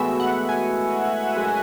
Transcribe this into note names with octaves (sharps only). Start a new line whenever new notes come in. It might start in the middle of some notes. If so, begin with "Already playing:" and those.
Already playing: A2 E3 G#3 B3 F#4 E5
F#5
G#5
F#2 C#3 G#3